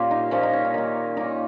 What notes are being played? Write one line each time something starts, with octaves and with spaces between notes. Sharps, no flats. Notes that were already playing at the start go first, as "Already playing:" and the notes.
Already playing: A#2 A#3 C#4 F4 G4
D#4
A#2 F3 A#3 C#4
D#4
C#4
D#4
D#3 A#3
D#3 A#3 D#4